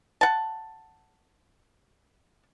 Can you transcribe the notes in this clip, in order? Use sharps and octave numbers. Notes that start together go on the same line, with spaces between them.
F#5 A5